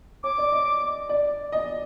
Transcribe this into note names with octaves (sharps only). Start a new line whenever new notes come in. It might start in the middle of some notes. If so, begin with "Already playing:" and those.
C#5 D6
D5
D#5
D5
D#5